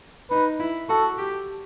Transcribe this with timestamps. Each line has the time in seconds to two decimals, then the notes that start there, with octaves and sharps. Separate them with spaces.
0.31 D#4 B4
0.60 E4
0.89 F#4 A4
1.18 G4